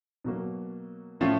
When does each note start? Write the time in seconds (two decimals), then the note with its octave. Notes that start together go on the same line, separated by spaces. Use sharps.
0.24 B2 F#3 A#3
1.20 A2 F3 A3 C#4 F4